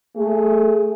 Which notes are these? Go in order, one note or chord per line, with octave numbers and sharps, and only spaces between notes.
A3 G#4